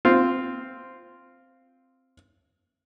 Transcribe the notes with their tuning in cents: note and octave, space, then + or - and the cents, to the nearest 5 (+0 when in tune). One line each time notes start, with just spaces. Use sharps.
C4 +0 F4 +0